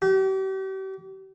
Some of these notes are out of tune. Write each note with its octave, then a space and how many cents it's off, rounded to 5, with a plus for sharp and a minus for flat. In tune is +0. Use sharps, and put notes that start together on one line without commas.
G4 -40